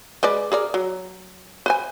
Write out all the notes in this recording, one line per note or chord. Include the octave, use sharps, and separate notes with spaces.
G#3 B4 D5
G#4 A#4 D5
F#3
B4 C5 G#5